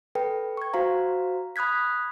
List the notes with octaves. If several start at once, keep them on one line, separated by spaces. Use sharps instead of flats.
A4 B4 G5
C#6 G#6
F#4 C5 F5 A#5
B5 D#6 F#6 G#6 B6